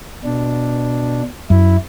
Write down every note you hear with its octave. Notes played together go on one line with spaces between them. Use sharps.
B2 D4
F#2 E4